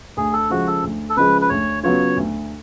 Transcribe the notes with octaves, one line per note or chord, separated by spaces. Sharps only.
D2 G#4
A4
C#3 F3 G#3 F#4
A4
D2
A4
C#3 F3 G#3 B4
B4
D2 C#5
C#3 F#3 B3 F4 C#5
D2